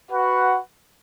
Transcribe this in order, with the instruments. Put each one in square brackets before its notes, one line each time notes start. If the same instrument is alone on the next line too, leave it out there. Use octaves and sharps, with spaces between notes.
[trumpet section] F#4 B4 F#5